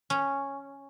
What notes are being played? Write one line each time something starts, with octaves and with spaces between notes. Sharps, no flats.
C#4